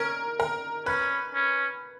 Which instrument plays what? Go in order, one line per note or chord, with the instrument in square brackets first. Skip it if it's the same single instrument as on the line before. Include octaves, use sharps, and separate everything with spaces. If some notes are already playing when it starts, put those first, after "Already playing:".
Already playing: [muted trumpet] C#4 [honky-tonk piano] A#4
[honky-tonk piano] A#4
[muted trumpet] C#4 [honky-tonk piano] B4
[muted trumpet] C#4